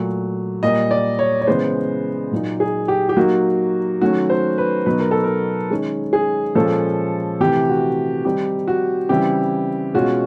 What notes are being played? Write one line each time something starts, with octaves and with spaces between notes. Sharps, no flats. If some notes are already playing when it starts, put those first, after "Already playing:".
Already playing: A#2 F#3 A3
A#2 G3 A#3 D#5
D5
C#5
C#5
C#3 E3 G#3 B3 C5
A#2 F#3 A#3 D#4
G#4
G4
G4
F#3 A#3 D#4 F#4
D#3 F#3 A3 C#4 F#4
C5
B4
B2 F#3 B3 D#4 B4
A#4
A4
A#4
D#3 G#3 C#4
G#4
A#2 F3 G#3 C#4 A4
C3 E3 A3 G4
F#4
D#3 G3 C4 D#4 G4
F#4
C#3 E3 G3 C4 E4 G4
B2 G#3 C#4 F4 F#4